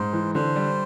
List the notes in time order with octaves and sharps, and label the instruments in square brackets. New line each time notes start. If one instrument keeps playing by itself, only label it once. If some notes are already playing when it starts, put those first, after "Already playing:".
Already playing: [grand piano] G#2 [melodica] C5
[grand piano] E3
[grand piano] D3 [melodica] C5
[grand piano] G3